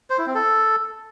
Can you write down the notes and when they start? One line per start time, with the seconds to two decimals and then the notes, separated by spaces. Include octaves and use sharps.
0.10 C5
0.18 E4
0.26 C4
0.34 A4